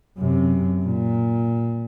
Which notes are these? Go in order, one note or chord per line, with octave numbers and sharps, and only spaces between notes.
F#2 C3
A#2